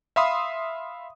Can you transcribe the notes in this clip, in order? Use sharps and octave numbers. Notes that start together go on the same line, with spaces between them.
E5 F5 B5 C6 D#6